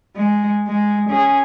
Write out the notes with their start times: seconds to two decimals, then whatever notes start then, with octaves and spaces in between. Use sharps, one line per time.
0.16 G#3
0.68 G#3
1.09 C#4 G#4